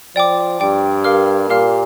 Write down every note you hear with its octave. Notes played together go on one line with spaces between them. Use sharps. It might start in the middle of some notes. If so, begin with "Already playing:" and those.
F3 D5 G5 D6
G2 D5 G5 D6
G4 A#4 F5 D6 F6
A#2 G4 A#4 F5 D6 F6